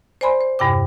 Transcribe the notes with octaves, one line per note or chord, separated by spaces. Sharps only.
C5 D5 G#5 B5 C6
C5
E2 G2 C3 G5 D6